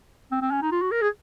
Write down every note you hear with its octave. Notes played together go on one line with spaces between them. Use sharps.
C4
C4
C#4
D#4
F4
F#4
A#4
G#4